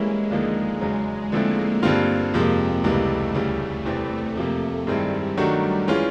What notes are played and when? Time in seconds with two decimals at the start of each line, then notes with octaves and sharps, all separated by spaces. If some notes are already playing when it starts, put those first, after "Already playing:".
Already playing: E3 G3 G#3 A#3 C#4 E4
0.31 D#2 D3 F3 A#3 D#4
0.81 E2 C#3 F#3
1.32 D3 F3 A3 A#3 C4 E4
1.83 G2 D3 G3 C4 F4
2.34 F2 C3 F3 G#3
2.84 C#2 C3 E3 G3 A3
3.34 D2 C#3 E3 G3
3.85 E2 C3 E3 G3 C4
4.36 F2 C3 F3 A#3
4.86 G2 D#3 G3 G#3 C4 E4
5.37 D#3 F#3 A3 D4 F#4
5.88 E3 G#3 C#4 F4